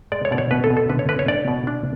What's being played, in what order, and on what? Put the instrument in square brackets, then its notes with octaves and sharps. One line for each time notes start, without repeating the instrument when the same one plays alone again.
[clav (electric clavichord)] G#3 D5
C#5
B2 D5
C#5
B2 B4
A4
B2
A4
D3 B4
C#5
D3 B4
C#5
D4 D5
B2
D4